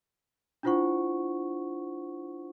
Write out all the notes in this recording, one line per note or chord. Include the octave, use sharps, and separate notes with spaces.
D4 E4 F4 C5 F#5 C#6